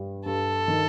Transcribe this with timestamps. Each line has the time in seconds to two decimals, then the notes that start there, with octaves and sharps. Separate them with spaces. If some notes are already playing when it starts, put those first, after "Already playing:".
Already playing: G2 G3
0.25 G2 A4
0.68 D#3